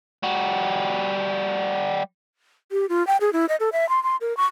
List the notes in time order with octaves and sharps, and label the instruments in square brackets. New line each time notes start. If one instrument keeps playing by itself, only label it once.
[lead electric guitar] G3 F#4
[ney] G4
F4
G5
G#4
E4
D#5
A4
E5
C6
C6
A#4
C#6